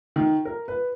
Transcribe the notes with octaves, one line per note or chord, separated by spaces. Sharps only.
D#3
A#4
B4